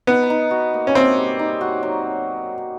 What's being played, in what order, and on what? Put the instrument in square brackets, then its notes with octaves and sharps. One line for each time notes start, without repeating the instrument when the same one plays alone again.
[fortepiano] B3 [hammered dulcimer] D#4
[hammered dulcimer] D#4
F#4
A#3
[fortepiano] C#4
[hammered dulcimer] A#3 [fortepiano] C4
[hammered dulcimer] G3
D#4
F#4
F#3